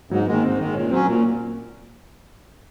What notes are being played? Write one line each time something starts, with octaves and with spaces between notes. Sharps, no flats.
G#2 F#3
D#3 G#3 A#3
G#2 C4
D#3 G#3
A#2 C#4
F#3 C4 C#4
A#2 A#3